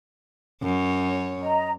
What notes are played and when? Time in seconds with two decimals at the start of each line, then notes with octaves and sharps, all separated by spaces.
0.62 F#2 C#5
1.41 D#5 A#5